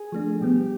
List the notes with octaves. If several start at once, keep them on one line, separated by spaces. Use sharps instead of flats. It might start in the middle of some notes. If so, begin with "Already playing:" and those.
Already playing: G#4
F3 A3 D4
B2 G3 B3 G4